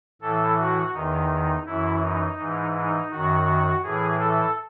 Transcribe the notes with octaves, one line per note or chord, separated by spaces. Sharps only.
A2 E3 A4
F#4
E2 D#3 D#4
F#2 E3 E4
D#4
G#2 E3
D#4
F#2 D#3 F#4
A2 E3 G#4
A4